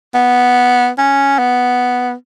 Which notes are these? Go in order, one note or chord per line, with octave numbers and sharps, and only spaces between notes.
B3
C#4
B3